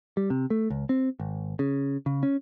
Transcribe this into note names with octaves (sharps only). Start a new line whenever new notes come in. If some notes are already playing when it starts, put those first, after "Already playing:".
G3
C3
A3
C#2
C4
G#1
C#3
C#3
C#4